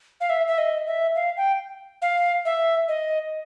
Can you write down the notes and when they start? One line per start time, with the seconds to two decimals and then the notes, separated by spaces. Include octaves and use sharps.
0.21 F5
0.30 E5
0.47 E5
0.58 D#5
0.87 E5
1.16 F5
1.37 G5
2.02 F5
2.45 E5
2.88 D#5